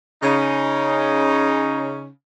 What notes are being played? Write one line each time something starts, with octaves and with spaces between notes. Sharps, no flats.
C#3 C#4 D#4